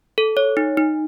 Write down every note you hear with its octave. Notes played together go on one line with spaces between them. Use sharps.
A4
C#5
D#4
D#4